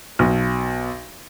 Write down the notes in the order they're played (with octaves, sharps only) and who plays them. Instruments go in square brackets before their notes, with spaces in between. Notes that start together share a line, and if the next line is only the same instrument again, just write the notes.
[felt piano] B1